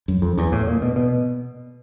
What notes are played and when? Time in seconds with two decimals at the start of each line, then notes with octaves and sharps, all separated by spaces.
0.08 F#2
0.22 F2
0.38 E2
0.52 A2
0.67 A#2
0.82 B2
0.96 B2